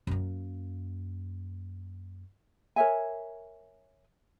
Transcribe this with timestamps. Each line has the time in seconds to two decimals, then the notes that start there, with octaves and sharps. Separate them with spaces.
0.07 F#2 A#3
2.76 A#4 C#5 E5 G#5